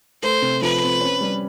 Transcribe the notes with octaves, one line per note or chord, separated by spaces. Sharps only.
A3 C5
C3
F3 B4
C4
C#4
G3